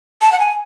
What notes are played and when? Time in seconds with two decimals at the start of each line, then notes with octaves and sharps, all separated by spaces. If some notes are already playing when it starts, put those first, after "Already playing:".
0.21 A5
0.32 F#5
0.40 G#5